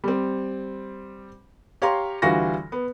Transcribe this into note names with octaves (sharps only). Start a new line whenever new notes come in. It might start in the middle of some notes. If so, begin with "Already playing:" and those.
G3 C4
G4 C#5 F5 A#5 C6
D2 E3 G3 F4 F#4 A#6
B3